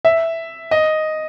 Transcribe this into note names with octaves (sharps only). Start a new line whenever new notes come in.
E5
D#5